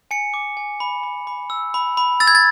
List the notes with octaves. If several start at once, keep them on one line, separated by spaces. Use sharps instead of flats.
G#5 C#7
D6
G#5
B5
B5
B5
E6
B5
B5
E6 A6
G#6
A6